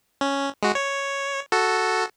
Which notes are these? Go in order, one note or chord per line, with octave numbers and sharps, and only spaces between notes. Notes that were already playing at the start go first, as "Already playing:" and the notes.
C#4
G#3 F#4
C#5
F#4 A4